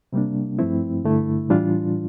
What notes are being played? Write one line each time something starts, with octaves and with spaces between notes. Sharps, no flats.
C3 G3 A#3 D4
G2 F3 A3 C4 E4
G2 D3 A3 E4
A2 E3 G3 D4 F4